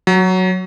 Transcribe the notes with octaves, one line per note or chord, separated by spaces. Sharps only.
F#3